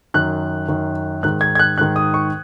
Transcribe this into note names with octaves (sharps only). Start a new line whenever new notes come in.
F#2 D#3 F#6
F#2 D#3
G#2 D#3 F#6
G#6
G#6
F#6
G#2 D#3 F#6
D#6
C#6